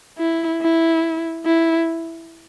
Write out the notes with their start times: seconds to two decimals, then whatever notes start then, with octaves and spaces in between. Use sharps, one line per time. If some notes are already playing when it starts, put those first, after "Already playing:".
0.18 E4
0.61 E4
1.46 E4